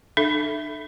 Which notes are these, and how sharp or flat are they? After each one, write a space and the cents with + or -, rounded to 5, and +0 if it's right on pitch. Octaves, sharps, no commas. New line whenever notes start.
D4 +45 A4 +0 E5 +0